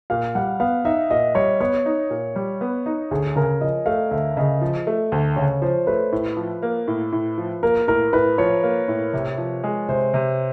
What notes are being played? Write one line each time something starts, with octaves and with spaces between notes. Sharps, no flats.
A#2 F5
G3 F#5
B3 F5
D#4 E5
A#2 D#5
G3 C#5
B3 C#5
D#4
A#2
G3
B3
D#4
D2 G#4
C#3 A#4
F3 D#5
A3 F5
D2 E5
C#3 D#5
F3
A3
D2
C#3 C#5
F3 C5
A3 B4
A2
F3
A#3
A2
A2
F3
A#3 A#4
A2 A#4
A2 B4
F3 C#5
A#3
A2
C3
F3
G#3
C3 C5
C3